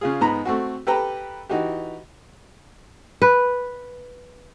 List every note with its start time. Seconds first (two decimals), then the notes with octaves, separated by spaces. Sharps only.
0.01 C#3 F4 G#4
0.21 G#2 B3 A#5 B5
0.45 A3 C4 F#4
0.87 G4 A4 B4 G5 A#5
1.49 E3 D#4 F#4 G4
3.22 B4